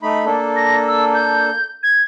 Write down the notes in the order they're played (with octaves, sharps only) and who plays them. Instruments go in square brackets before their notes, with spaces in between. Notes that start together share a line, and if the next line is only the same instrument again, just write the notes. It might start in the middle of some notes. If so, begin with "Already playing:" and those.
[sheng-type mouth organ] A3 D#4 B5
A#3 D4 A4
[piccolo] A#6
E6
G6
G#6